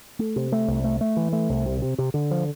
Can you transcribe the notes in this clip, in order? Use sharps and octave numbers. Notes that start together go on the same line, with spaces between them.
A3
C3
A3
C2
A3
A3
E3
A3
C2
C3
C3
C3
D3
F3